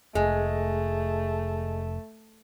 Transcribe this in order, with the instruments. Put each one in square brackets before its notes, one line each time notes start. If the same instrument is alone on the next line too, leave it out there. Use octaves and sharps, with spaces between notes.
[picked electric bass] F1 [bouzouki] G#3 [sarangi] A3 [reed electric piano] G#4